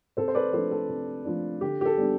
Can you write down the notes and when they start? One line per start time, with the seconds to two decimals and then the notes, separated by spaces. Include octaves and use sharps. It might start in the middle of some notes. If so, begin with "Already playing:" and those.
0.17 C3 A4 C5
0.28 C5
0.35 B4 D5
0.53 F3 A3 D4 A4 C5
0.71 A4
0.89 C3
1.25 F3 A3 D4
1.61 D3 G4
1.81 G4
1.86 A4
1.97 G3 B3 D4